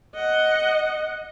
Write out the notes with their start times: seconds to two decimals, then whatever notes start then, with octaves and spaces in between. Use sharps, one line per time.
0.15 D#5 F#5